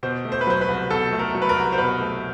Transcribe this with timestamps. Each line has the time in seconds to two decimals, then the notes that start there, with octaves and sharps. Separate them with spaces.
0.03 B2 C5
0.25 A3
0.32 C5
0.41 B4
0.47 F#3 C5
0.61 B4
0.68 C2
0.91 B2 A4
1.13 A3
1.19 A#4
1.35 F#3
1.42 B4
1.49 A#4
1.56 C2
1.73 C5
1.78 B2 B4
2.01 A3